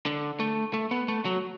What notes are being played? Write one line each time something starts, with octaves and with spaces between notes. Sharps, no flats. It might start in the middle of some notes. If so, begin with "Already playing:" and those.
D3
A3
A3
B3
A3
F#3